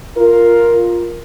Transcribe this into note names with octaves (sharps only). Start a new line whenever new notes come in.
F4 A#4